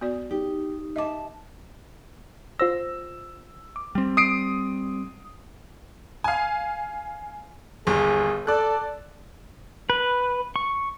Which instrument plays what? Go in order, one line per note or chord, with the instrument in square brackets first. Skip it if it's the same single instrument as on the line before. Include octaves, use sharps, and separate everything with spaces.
[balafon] B3 F#4 D5
[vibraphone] D#4 [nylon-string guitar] G4
[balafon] D#5 D6 [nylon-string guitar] E5 G#5 A5
[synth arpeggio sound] F4 C5 A#6 [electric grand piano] E6
[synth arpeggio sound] D6
[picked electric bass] G3 C4
[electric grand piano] D#6 C7 D7
[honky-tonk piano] F5 G#5
[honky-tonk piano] G1 D#2 [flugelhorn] G#4
[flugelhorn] A4 [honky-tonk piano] D5 F#6
[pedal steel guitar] B4
C#6